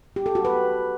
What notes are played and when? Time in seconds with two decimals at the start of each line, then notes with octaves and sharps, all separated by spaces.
0.16 G4
0.26 A4
0.35 F#4
0.45 B4